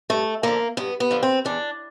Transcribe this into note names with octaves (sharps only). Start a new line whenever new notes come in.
G2 A3
D3 F3 A#3
G2 B3
B3
D3 F3
C4
E2 D4